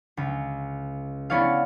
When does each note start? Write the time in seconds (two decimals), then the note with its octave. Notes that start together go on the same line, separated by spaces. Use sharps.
0.17 C#2
1.30 B3 C#4 E4 C#5 D5 F5